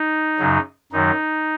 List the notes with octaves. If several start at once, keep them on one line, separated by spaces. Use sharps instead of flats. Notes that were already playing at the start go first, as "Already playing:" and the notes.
Already playing: D#4
F#2 C#3 F#3
F#2 D#3 F#3 D#4